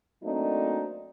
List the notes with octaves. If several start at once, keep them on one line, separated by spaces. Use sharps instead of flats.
F#3 A3 A#3 C4 D4 D#4